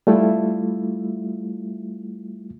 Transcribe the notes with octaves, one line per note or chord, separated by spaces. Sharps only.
G3 A3 E4 F4